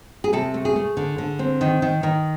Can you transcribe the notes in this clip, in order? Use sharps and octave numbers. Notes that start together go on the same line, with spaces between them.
G#4
C3 A4
A3
G#4
A3
D3
D3
C4
D#3
D#3
D#3